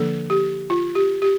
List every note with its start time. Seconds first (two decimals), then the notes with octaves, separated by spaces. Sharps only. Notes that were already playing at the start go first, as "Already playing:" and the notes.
Already playing: D3 F3 A#3 D4 A4
0.30 G4
0.70 F4
0.95 G4
1.22 G4